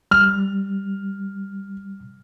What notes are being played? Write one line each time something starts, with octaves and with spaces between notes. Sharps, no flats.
G3 F6